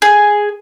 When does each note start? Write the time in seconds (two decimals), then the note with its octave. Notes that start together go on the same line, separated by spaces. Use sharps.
0.02 G#4